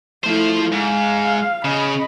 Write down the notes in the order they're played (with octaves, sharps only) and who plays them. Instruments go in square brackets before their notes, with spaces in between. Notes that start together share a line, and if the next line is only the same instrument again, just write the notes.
[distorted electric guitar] F3 C5 [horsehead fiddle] A3 E4
[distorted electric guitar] G#2 [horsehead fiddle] F5
[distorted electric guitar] C#3 [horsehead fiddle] D#5 B5